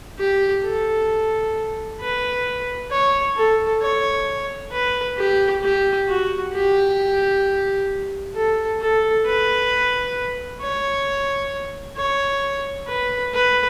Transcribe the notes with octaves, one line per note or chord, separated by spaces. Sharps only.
G4
A4
B4
C#5
A4
C#5
B4
G4
G4
F#4
G4
A4
A4
B4
C#5
C#5
B4
B4